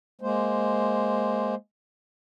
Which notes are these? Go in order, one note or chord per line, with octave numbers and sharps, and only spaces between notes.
G#3 A#3 C5